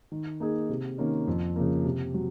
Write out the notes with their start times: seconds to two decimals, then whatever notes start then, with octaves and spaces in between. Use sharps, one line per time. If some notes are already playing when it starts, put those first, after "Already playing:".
0.12 D#3
0.40 A#3 D#4 G#4
0.69 C3
0.98 D#3 A#3 C#4
1.27 F2
1.56 C#3 F3 A#3
1.85 C3
2.14 F#3